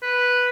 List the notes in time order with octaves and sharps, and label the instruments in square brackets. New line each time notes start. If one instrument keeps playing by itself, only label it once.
[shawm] B4